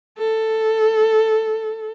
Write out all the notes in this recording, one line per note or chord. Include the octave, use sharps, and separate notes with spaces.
A4